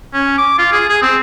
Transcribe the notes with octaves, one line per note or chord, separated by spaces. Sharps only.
C#4
D6
F4
G#4
G#4
C4